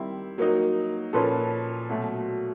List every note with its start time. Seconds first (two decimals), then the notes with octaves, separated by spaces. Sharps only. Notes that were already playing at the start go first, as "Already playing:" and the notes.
Already playing: D#3 G3 C4 E4
0.38 F#3 A#3 D#4
1.13 A#2 F3 A#3 C#4 A4 B4
1.89 B2 F#3 A3